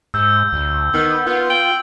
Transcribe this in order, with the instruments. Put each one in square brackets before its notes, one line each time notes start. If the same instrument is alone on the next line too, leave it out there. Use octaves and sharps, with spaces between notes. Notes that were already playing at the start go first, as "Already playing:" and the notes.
[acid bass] G#2 [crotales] E6 G6
[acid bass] D2
[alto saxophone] D#3 [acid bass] B3
[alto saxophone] B3 [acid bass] F4
[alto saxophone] G5 [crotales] F#7